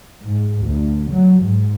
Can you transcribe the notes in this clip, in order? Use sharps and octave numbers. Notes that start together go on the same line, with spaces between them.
G#2
D2
F#3
G#2